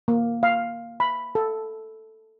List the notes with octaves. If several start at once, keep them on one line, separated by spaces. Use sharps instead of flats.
A#3
F5
B5
A4